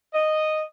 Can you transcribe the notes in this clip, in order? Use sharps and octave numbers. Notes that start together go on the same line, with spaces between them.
D#5